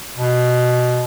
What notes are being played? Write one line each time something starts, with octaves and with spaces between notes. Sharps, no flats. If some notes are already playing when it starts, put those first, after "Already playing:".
B2